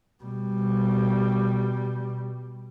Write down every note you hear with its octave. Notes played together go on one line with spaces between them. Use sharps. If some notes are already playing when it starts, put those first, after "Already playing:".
B2 G3